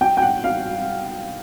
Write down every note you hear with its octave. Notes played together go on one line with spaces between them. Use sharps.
G5
G5
F#5
F5